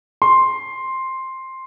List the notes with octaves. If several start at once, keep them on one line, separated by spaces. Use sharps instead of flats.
C6